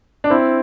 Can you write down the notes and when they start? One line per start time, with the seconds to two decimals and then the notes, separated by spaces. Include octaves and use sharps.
0.24 D4
0.30 C4 E4